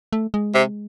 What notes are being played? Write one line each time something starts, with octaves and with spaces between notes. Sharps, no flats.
A3
G#3
C3